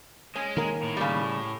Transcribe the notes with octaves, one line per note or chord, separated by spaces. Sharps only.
G#3 C#4
D#3 A#3 A#4
A2
C#3 G3